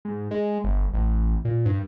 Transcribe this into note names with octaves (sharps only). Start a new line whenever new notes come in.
G#2
G#3
G1
A1
A#2
G2